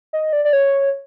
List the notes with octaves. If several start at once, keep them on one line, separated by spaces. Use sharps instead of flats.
D#5
D5
D5
C#5